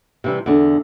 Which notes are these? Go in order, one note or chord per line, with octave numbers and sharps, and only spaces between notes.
C3 E3 G3
E2 D3